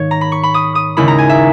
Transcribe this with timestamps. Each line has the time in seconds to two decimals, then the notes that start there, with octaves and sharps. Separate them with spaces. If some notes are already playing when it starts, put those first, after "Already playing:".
Already playing: G#2 D#3 A#3 C#5
0.11 A#5
0.21 B5
0.32 C#6
0.43 B5
0.54 D#6
0.75 D#6
0.97 D#2 C#3 G#3 C#4 E4 B5
1.08 A#5
1.18 G#5
1.29 E5